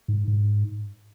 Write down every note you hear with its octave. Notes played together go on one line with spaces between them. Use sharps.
G#2
G#2